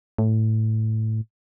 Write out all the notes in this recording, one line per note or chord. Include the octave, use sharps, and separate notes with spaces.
A2